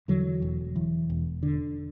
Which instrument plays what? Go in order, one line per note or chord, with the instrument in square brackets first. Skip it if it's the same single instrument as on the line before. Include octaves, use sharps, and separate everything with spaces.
[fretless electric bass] E2 D3 F#3
E1
E2
E1
D3